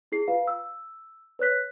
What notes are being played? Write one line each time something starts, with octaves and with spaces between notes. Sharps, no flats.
E4 G#4 C7
F4 B4 F5
E6
B4 C#5 F#6 B6